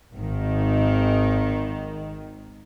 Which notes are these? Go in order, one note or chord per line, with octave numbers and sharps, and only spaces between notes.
G#1 D#3